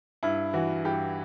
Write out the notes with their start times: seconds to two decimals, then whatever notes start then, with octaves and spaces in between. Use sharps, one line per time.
0.23 G2 E4
0.53 E3 F#4
0.85 G2 G4